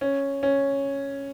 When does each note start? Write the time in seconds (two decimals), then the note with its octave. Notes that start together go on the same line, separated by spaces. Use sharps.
0.01 C#4
0.43 C#4